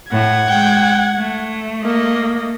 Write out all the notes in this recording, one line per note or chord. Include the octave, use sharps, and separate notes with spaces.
A2 F#5 G#6
G#3 G5
A3
A#3 D#5